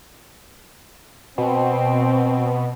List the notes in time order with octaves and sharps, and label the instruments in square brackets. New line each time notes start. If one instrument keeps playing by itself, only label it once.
[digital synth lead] B2 [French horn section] C4